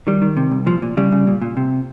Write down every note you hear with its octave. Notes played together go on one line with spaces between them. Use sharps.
D#3 G3
D#3
C3
C2
A#2 F3
A#2
C#3 G3
C#3
A#2
A#2
C3